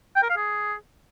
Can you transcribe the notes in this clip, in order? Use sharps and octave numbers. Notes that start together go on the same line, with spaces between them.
G5
A#4
F5
G#4